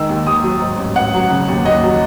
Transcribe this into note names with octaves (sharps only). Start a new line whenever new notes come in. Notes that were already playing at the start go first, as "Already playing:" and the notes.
Already playing: D#3 G#3 E6
D#2
D#2 D#6
F#3
G#2
A1
A1 F#5
F#3
C#3
D#2
D#2 D#5
F#3